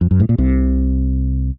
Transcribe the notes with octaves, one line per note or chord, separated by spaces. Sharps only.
F2
F#2
A2
A#2
C2 C3